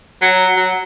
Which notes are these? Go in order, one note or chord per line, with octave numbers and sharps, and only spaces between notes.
F#3
F#3